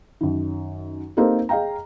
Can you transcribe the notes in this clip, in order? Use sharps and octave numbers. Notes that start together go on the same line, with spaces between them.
F#2 D#3
A#3 C4 D#4 G4 A4
G#4 D#5 F5 G5 A#5